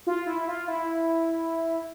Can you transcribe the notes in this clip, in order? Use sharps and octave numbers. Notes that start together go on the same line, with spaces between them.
F4
E4
F4
E4